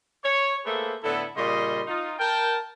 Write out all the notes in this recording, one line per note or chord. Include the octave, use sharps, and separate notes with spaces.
C#5
A3 A#3 G#4 A4 B4 C5
A2 D3 B3 E4 A4 B4
A#2 C#3 G3 D#5 C6
D#4 F4
A#4 G5 A5